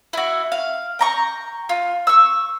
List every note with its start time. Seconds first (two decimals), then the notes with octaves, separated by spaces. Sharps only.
0.13 E4 F#4
0.52 F5
0.99 G5 A#5 C#6
1.69 F4
2.07 C#6 E6